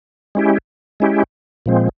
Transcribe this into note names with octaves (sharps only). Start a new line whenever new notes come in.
G#3 C#4 E4 G4
G#3 C#4 E4 G4
A#2 F3 G#3 C4